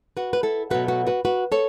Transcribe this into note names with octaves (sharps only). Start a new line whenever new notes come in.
F#4 B4
B4
E4 A4
B2 F#3 A3 F#4 B4
F#4 B4
F#4 B4
F#4 B4
A4 C#5